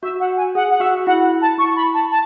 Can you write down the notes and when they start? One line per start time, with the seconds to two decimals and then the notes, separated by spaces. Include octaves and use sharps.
0.02 F#4 E5
0.19 F#5
0.37 G#5
0.55 G#4 F#5
0.70 F#5
0.80 F#4 E5
1.06 E4 F#5
1.41 A5
1.58 E4 C#6
1.75 B5
1.93 A5
2.10 A5